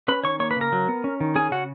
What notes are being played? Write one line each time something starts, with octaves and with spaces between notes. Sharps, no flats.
C#4 B4 B5
D#3 C#5 C#6
A#3 C#5 C#6
B4 B5
C#3 A#4 A#5
F#3
B3
C#4
D#3
C#4 G#4 G#5
C#3 F#4 F#5